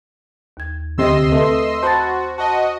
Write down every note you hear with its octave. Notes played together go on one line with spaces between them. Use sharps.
D#2 G#6
D2 C3 C4 D#5 C6 E6
A3 C4 B4
F#4 C5 A5 B5 A6
F#4 D#5 A5